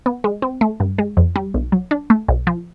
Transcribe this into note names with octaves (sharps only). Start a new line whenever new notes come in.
B3
G#3
C4
A3
G2
G#3
F2
G3
B1
F#3
D4
A3
B1
F3